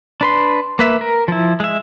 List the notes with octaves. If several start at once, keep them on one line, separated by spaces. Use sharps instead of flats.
D4 B4 C6
A#3 B4 E5
A#4
F3 E4
G#3 E5